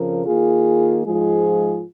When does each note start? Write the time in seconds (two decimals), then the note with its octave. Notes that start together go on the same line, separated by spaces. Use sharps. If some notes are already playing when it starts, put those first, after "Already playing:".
Already playing: F2 C#3 F3 A#4
0.25 D#3 A#3 F4 G#4
1.03 G#2 F3 G#3 F4 G#4